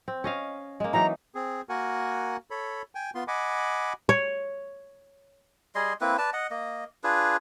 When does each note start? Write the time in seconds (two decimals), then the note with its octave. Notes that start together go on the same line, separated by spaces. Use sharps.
0.08 C4
0.24 C#4 D#5 F5
0.80 G#3 A#3
0.93 E3 F#3 D#4 A#5
1.35 C4 G#4
1.69 A#3 F#4 A#4 F#5 G#5
2.51 A4 C#5 B5
2.95 G5 G#5
3.15 B3 F4 C6
3.28 D#5 F#5 G#5 B5 D6
4.09 C#5
5.75 G3 G#4 D#5 C6
6.01 A#3 C4 E4 B4
6.18 B4 D5 A5
6.33 D#5 F#5
6.51 A#3 D#5
7.04 D4 F4 G#4 B4